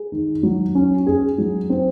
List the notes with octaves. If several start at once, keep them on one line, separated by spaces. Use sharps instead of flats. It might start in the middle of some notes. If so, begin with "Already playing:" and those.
Already playing: G#4
D#3
F#3
C#4
G#4
F#3
C4